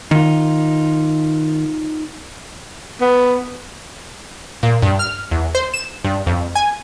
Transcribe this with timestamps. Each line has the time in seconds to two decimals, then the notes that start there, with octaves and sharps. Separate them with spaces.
0.11 D#3 D#4 F4
3.01 B3
4.63 A#2
4.82 G2
4.99 F6
5.31 E2
5.55 C5
5.74 E7
6.04 G2
6.26 F2
6.55 G#5